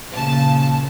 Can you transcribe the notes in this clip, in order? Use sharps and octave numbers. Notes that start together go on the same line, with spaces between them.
A#2 C#3 A5